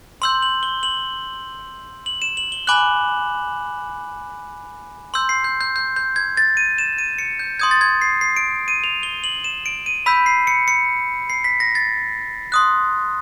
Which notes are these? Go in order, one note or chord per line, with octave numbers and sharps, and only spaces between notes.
C6 E6 G6 F#7
F#7
G7
F#7
F#7
E7
F#7
G7
G#5 B5 D6 F#6 F#7
C6 E6 G6
C7
G6
G6
G6
G6
G#6
A6
D#7
E7
D#7
C#7
G6
C6 D#6 G6 G#6
A6
G#6
C7
C7
D7
D#7
F7
G7
F#7
E7
D7
D#7
B5 E6 G6 B6
C7
C#7
C#7
C7
B6
A#6
A6
C6 D#6 F#6